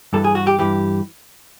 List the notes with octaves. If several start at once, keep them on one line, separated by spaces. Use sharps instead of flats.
G2 E3 A4
G#4
F#4
G4
G2 E3 G4